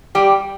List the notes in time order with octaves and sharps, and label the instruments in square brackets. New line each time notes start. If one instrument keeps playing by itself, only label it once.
[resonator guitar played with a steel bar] G3 G4